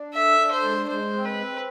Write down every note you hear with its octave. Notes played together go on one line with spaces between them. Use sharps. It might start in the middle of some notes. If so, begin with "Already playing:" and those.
Already playing: D4
A4 E5
D4
C5
G#3
G#3 C5
C4
B4
C4